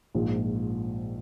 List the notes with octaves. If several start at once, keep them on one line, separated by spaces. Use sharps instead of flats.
A#1 G#2 F3 G#3